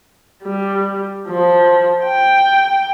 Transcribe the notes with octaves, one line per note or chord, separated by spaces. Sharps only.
G3
F3
G5